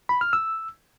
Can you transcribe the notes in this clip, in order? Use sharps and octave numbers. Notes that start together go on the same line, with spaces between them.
B5
F6
E6